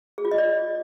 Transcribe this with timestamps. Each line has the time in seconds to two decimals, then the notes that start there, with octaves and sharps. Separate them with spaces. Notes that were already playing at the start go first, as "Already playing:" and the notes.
0.18 G#4
0.25 F4
0.31 D#5
0.38 D5